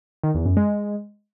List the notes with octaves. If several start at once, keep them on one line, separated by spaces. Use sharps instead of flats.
D#3
E2
F#2
G#3